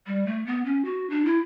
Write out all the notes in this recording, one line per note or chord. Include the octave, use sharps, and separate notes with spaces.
G3
A3
B3
C#4
F#4
D4
E4